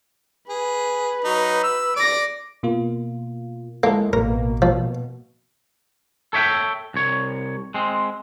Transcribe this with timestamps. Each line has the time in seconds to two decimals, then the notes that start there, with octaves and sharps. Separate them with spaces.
0.49 G#4 B4
1.25 F#3 D#4
1.63 E6
1.96 D5 A#6 D7
2.63 B2 A#3 F4
3.83 G#3 A#3 E4 A4
4.13 A1 B2 A#3 A#4
4.62 B2 F3
6.33 A4 C#5 E5 G5
6.94 C2 C#5
7.74 G#3 C4